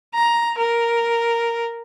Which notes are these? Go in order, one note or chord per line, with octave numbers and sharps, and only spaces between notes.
A#5
A#4